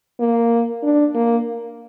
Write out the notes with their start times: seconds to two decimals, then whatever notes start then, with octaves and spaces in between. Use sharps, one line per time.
0.20 A#3
0.83 D4
1.15 A#3